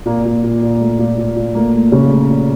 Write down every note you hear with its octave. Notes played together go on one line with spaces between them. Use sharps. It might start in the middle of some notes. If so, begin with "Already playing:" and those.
A#2 A#3
A#2
A#2
A#2
A3
A#2
A#2
A#2
A3 A#3
A3
C#3 A3 C#4
A3
A#2